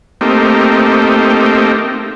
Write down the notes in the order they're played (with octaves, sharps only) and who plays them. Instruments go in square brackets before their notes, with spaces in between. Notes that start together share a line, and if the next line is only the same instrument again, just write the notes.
[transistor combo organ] A3 A#3 C4 D#4 G4